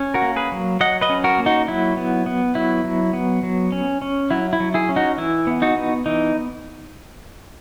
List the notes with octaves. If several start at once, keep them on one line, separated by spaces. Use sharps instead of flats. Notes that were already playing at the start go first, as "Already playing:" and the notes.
Already playing: C#4
F#4 A#4
A#3
G#4 B4
F#3
F#3 D#5 F#5
B4 D#5
C#4
F#4 A#4
A#3
D#4 F#4
F#3 E4
B3
B3
F#3 E4
F#3
B3
F#3
C#4
C#4
F#3 E4
E4
F#3
E4 G#4
C#4
D#4 F#4
E3 E4
B3
D#4 F#4
B3
E3 D#4